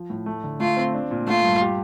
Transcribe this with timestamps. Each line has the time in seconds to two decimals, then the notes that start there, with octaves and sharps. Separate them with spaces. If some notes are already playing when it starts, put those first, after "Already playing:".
Already playing: F3
0.10 A2
0.26 A3
0.44 D3
0.60 A3 F4
0.77 C4
0.94 D4
1.11 A#2
1.27 A3 F4
1.44 G2
1.61 G4